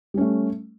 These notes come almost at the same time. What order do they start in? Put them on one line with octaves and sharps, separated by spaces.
G3 C#4 A3